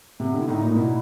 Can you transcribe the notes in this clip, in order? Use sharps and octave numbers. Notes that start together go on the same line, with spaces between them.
C3 B3
D3
E4
A2 D#4
A#2
B2 E4